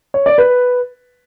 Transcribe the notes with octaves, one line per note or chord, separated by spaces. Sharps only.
C#5
D5
B4